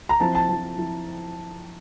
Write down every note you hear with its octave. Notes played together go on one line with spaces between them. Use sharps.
A#5
F3 C4 E4 A5
A5
F3 C4 E4 A5
F3 C4 E4